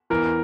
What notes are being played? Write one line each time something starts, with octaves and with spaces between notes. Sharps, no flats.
E2 E3 A#4